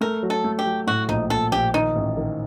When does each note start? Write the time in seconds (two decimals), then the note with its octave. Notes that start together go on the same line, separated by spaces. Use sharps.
0.01 A3 A#4
0.23 F#3
0.30 A4
0.44 A3
0.59 G4
0.66 F#3
0.87 A2 F#4
1.09 A#1 D#4
1.30 A#1 A4
1.52 A#1 G4
1.74 D#3 D#4
1.96 A1
2.17 D#3